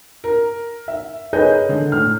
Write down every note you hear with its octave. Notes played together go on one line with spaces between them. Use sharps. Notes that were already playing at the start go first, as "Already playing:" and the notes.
A#4
E5
G#4 A#4 B4 C#5 D#5 G6
D3
A2 F6